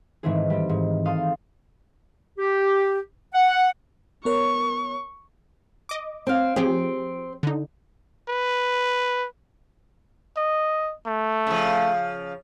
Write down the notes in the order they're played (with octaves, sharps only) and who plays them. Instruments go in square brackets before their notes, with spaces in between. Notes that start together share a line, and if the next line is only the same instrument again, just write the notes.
[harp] G#2 D#3 E3 A3 C4 G#4
G3 C4
G#2
A4 F5 C6 D#6
[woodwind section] G4
F#5
[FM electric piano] B3 A#4 C#5 [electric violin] C#6
[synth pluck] D#5 D6
[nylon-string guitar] C4 F5
[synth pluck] F3 G4 G#4 [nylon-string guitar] C4
[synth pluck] D3 D#4
[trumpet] B4
[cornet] D#5
A3
[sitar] C#3 F3